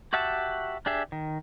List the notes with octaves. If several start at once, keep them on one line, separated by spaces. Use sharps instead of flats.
F#4 G4 E5 F#5 A5
D4 G4 G#4 E5
D#3